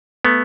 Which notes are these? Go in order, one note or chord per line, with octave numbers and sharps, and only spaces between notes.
A3 B3